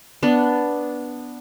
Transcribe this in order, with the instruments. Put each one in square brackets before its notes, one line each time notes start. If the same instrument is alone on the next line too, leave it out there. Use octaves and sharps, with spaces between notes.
[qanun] B3 D4